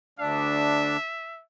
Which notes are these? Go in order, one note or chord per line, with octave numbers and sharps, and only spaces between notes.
D2 D4 E5